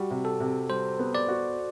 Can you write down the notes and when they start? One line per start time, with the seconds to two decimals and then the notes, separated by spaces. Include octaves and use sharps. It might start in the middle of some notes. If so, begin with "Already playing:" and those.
Already playing: G3 F#4
0.10 C3
0.25 A4
0.40 C3
0.70 G3 C5
0.99 B3
1.15 D5
1.28 F#4